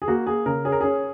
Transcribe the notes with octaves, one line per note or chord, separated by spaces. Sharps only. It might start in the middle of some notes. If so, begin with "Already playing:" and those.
G#4
A#3 F#4
A#3 G#4
C#3 A#4
C#4 G#4
A#4
C#4 G#4